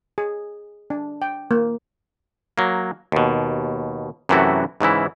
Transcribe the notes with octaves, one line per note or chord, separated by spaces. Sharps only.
G#4
D4
G5
A#3
F#3 A#3
D#2 B2
F#2 C3 E3 A3 E4 F#4
G#2 C#3 E3 E4